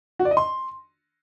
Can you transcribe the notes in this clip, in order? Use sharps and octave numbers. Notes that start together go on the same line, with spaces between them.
F#4
D5
D#5
C6